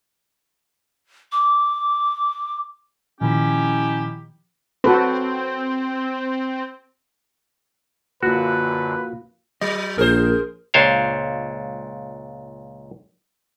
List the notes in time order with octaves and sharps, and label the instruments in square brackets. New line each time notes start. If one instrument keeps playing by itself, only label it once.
[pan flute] D6
[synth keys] A#2 D#3 F3 [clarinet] C#4 [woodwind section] D#4 E4 G4
[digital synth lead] C4 [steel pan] F#4 A4 B4
[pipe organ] F#2 D3 [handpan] A#3 F4 [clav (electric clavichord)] F#4 [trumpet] B4
[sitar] F#3 [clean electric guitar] D#5
[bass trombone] A#1 [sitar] G#4 C5 [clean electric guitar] A#4
[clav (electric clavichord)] C#2 A#2 D4 C5 C#5 F5